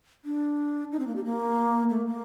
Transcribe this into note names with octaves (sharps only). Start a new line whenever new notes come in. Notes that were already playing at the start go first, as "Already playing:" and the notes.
D4
D#4
C4
A#3
G4
A#3
A3
A#3